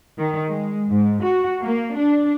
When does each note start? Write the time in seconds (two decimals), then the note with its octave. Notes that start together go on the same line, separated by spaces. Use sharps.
0.18 D#3
0.49 G#3
0.89 G#2
1.22 F#4
1.63 A#3
1.95 D4